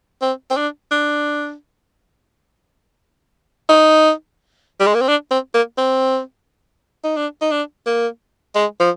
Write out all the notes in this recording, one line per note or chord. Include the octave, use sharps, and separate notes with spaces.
C4
C4
D4
D4
D#4
G3
G#3
A#3
C4
D4
C4
A#3
C4
D#4
D4
D#4
D4
A#3
G#3
F3